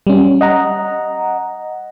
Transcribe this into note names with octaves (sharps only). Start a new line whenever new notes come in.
G3 C#4
D#5 F#5 A#5